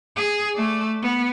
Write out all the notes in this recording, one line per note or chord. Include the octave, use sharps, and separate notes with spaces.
G#4
A3 D5
B3